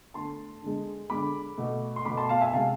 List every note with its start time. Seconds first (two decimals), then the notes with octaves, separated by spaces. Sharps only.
0.14 D3 A3 A5 C6
0.62 D3 G#3
1.10 D3 G#3 B5 D6
1.58 B2 A3
1.96 C6
2.05 B2 A3 B5 D6
2.17 A5 C6
2.29 F5 A5
2.41 E5 G#5
2.53 C3 G#3 F5 A5